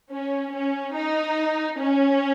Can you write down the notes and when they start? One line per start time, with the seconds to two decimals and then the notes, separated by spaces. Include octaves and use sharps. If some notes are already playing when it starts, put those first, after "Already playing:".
0.11 C#4
0.53 C#4
0.95 D#4
1.78 C#4